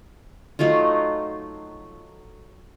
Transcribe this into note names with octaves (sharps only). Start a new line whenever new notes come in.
F#3 A3 D#4 F4